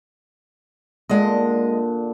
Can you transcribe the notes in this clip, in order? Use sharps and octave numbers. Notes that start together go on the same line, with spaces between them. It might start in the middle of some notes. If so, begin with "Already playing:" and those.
A#2 D3 G#3 D#5